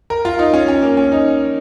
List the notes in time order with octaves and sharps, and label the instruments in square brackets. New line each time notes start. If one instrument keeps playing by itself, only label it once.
[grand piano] A#4
F4
D#4
C#4
C#4
A#3
C#4
D#4